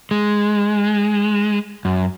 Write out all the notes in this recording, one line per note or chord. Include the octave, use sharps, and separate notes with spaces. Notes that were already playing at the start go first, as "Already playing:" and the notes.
G#3
F#2